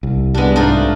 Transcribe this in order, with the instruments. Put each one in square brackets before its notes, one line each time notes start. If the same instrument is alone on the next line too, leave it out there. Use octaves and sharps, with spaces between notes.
[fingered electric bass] C2
[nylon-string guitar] G3 B3 [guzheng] G#3 D4
[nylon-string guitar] G#2 A3 [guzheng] D4 D#4 F4